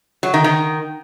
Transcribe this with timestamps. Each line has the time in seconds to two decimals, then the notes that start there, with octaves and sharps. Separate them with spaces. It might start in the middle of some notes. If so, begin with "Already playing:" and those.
0.23 F#3
0.34 D#3
0.44 D#3